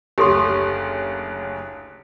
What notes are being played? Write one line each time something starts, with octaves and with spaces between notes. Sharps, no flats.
F#1 D2 G4 A4 C6